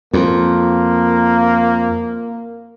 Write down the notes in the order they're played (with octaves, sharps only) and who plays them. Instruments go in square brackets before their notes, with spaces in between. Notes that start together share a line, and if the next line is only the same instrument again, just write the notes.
[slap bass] F2 [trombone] A#3